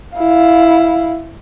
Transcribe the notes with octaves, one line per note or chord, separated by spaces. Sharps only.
E4 F5